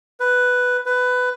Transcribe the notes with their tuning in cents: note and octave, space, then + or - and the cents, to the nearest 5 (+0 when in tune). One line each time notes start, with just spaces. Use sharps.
B4 +5
B4 +15